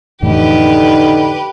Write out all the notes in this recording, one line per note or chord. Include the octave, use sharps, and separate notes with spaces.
F2 A2 D3 E3 D#4 G4 B4